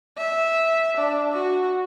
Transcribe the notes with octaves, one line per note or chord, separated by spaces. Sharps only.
E5
D4
F#4